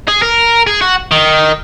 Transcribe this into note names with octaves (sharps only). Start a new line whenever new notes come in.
G#4
A#4
G#4
F#4
D#3